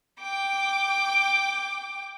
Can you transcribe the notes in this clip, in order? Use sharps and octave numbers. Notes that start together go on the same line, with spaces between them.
G5 D6